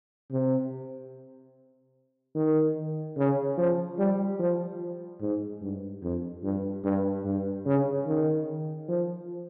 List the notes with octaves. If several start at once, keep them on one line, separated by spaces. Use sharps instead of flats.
C3
D#3
C#3
F3
G3
F3
G#2
G2
F2
G2
G2
G2
C#3
D#3
F3